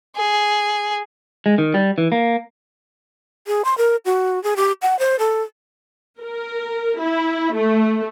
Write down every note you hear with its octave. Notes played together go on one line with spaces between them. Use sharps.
G#4
G#3
D#3
G3
E3
A#3
G#4
C6
A#4
F#4
G#4
G4
F#5
C5
A4
A#4
E4
A3